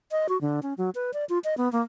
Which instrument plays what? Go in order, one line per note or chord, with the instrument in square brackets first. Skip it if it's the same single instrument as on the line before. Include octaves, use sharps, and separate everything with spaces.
[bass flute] D#5
F#4
D3
C#4
F#3
B4
D5
F4
D#5
B3
A#3